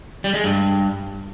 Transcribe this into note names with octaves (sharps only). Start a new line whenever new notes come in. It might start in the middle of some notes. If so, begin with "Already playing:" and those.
G3
G#3
G2